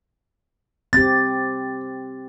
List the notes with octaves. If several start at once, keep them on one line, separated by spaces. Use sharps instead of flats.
C4 G4 A6